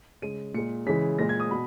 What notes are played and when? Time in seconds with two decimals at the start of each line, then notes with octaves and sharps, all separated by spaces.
0.22 C#3 G#3 D#7
0.54 A#2 G#3 C#7
0.86 C#3 E3 G#3 B6
1.19 A#2 G#3 A#6
1.29 G#6
1.40 D#6
1.51 B2 B5